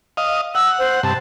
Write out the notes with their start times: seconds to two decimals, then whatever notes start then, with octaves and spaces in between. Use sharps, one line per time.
0.17 D#5 F5
0.55 F#5 E6
0.79 C5
1.03 G2 C3 A5